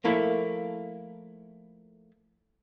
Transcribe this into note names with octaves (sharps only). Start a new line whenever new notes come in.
F3 A3 A#3 E4 A4 E5